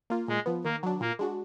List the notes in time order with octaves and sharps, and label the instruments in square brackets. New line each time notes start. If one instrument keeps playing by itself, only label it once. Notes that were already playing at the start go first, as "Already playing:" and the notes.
[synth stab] A#3 F4
[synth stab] A#2 [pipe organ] G#3
[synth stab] F3 B3
[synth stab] D#3 [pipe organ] A#3
[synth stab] F#3 D4
[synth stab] A#2 [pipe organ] A#3
[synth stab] G#3 D4 F#4